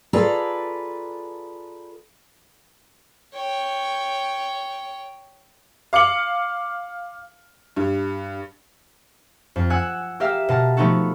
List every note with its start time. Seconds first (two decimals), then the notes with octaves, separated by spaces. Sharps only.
0.13 F4 G#4 A4 B4 D5 A#5
3.34 C#5 G5
5.93 F5 D6 C#7 F#7
7.76 G2
9.56 F2
9.70 F#5 G#5 E6 F#6
10.20 G4 A#4 E5 F5
10.49 B2 A#4 A5
10.77 F3 A3 B3 D#4 F#4 A4